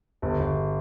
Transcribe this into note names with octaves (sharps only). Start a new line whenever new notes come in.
G1
G1